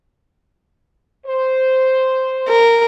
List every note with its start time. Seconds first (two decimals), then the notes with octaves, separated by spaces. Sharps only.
1.26 C5
2.48 A#4